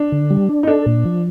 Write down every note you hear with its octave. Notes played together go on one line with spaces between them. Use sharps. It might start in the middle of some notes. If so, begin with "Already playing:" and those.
Already playing: D4
D3
G3
D4
D#4
D4 A4
A#2
F3